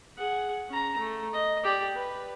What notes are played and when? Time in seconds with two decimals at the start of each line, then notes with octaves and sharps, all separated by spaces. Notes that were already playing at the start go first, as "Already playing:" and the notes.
0.17 G#4 F#5
0.69 C#4 A#5
0.98 A3
1.33 D#5
1.63 G4 D5
1.95 B4